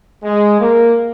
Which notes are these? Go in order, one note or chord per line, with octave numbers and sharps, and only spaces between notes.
G#3
A#3